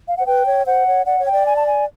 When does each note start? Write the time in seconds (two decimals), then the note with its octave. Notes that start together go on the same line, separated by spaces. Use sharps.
0.08 F5
0.17 C5 F#5
0.26 B4 G5
0.46 C#5
0.66 C5 F#5
0.87 C#5
1.06 D5 F#5
1.19 C#5
1.26 G5
1.32 D5
1.46 G#5
1.56 A5
1.67 G#5